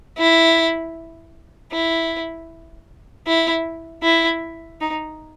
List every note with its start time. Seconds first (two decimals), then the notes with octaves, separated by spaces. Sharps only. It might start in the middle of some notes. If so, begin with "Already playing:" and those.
0.18 E4
1.72 E4
3.27 E4
4.03 E4
4.81 D#4